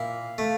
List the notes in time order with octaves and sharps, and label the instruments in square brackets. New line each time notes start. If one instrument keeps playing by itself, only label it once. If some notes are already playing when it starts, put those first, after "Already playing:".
Already playing: [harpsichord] A#2 E4 [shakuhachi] F5
[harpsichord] A3